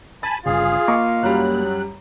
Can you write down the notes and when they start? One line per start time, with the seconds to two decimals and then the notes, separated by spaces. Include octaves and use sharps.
0.23 G#5 A5 B5 A6
0.46 G1 G2 C#3 F4 G#4
0.88 A#3 D#5 C#6 D6
1.23 F#2 F#3 G3 F#6